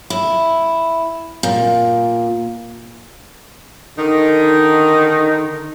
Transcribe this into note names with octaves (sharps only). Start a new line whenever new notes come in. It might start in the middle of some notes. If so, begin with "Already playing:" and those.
E4
A#2
D3 D#3 D#4